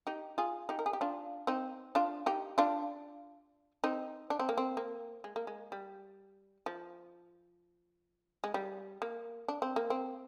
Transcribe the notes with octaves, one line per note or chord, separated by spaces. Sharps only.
D#4 G4
F4 G#4
D#4 G4
A#4
G#4
G4
D4 F4
C4 D#4
D4 F4
D#4 G4
D4 F4
C4 D#4
D4
C4
A#3
C4
A#3
G#3
A#3
G#3
G3
F3
G#3
G3
A#3
D4
C4
A#3
C4